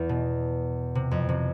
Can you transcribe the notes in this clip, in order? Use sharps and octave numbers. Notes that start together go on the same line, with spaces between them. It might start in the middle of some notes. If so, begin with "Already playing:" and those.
Already playing: E2
B2
C3
F2
C3